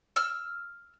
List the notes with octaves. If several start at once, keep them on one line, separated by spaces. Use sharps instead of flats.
E6 F6